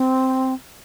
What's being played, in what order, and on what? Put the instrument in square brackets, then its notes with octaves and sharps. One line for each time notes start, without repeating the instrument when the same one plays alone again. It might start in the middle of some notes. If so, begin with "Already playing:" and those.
Already playing: [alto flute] C4